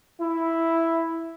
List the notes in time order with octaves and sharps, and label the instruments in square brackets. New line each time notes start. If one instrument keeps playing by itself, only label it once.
[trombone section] E4